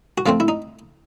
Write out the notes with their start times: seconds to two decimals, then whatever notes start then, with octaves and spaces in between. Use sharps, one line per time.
0.18 F#4
0.26 F3 A3 C4 F4
0.40 E4
0.48 D#4